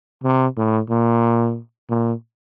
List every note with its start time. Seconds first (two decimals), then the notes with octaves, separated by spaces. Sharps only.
0.24 C3
0.57 A2
0.90 A#2
1.90 A#2